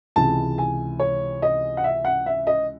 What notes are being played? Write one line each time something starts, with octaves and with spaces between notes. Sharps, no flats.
C#2 C3 E3 G#3 A5
G#5
C#5
D#5
F#5
E5
F#5
E5
D#5